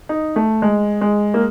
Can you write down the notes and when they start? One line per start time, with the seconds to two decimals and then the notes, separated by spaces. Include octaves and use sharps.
0.09 D#4
0.36 A3
0.62 G#3
1.01 G#3
1.34 A#3